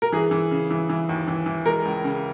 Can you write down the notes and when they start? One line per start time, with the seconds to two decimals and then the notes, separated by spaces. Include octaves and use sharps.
0.02 A#4
0.12 E3 G#4
0.31 E3
0.51 C#3
0.71 E3
0.90 E3
1.09 D#2
1.28 E3
1.46 E3
1.66 G#3 A#4
1.85 C#2
2.04 C#3